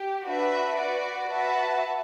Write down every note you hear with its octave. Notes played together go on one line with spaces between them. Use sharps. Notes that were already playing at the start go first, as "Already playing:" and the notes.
Already playing: G4
D4 F#4 B4 E5
F#4 B4 D5
F#4 B4 E5 A5